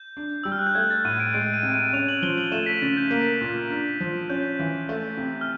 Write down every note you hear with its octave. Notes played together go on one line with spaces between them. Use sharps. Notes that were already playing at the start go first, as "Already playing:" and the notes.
Already playing: G6
D4
G3 E6
F6
F#6
G6
A3 G#6
A6
A2 D#7
D7
G#3 D7
D#7
C3
D#7
C#4 F7
F#7
F3 G7
F#7
A3 E7
B6
C#3 A6
G6
A#3
A#2
D4
F3
C#4 G6
E3
A3
C3
F6